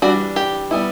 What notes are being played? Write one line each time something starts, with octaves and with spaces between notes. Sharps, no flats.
E3 G3 D4 F#4
G4
G3 B3 E4